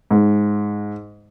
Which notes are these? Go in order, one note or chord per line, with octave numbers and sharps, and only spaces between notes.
G#2